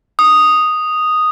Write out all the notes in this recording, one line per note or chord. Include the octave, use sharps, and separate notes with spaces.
D#6